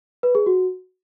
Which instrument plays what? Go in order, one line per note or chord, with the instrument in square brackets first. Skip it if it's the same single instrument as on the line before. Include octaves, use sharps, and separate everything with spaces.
[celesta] B4
G#4
F#4